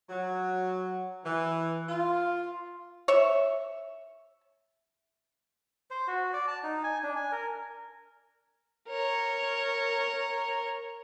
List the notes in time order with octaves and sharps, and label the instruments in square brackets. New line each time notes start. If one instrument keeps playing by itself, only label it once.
[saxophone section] F#3
E3
F4
[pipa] C#5 E5
[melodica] C5
F#4
D5
A5
D#4
G#5
D4
G#5
A#4
[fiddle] A#4 C#5